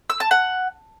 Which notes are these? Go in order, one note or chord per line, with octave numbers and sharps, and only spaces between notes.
E6
A5
F#5